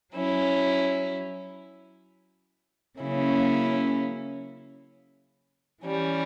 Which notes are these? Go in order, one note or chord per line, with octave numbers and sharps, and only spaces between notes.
F#3 C#4 E4
C#3 F#3 A#3 C#4 E4
E3 G3 C#4